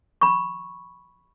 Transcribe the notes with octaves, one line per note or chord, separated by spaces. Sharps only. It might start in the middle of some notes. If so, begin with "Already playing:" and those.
B5 C#6